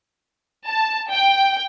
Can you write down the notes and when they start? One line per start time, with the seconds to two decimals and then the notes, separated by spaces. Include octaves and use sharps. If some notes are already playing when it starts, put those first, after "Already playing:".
0.67 A5
1.12 G5